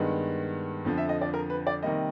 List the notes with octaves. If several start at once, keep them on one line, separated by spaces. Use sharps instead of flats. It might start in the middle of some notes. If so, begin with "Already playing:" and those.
Already playing: G2 D#3 G#3 B3
F2 D3 F3
E5
D#5
D5
A#4
B4
D5
C3 D#3 G3 A#3 D#5